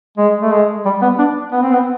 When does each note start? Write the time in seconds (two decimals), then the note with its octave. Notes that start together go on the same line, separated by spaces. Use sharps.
0.18 G#3
0.42 A3
0.52 G#3
0.85 G3
1.02 B3
1.18 D4
1.52 B3
1.62 C4
1.73 B3